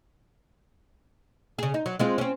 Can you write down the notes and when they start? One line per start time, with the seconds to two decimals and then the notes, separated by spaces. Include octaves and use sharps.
1.59 C#3 G#4
1.74 D#4
1.86 F#3
1.99 G#3 C4 F4
2.18 C4 C#4